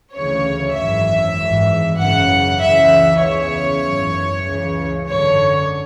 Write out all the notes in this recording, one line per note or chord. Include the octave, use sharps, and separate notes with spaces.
D2 C#3 E3 C#5
G#1 F#2 E3 E5
G#1 G#2 E3
G#1 F#2 C#3 E3 F#5
C#2 C#3 E3 E5
E2 C#3 E3 C#5
G#1 F#2 E3
C#2 C#3 E3
G#1 F#2 D3 C#5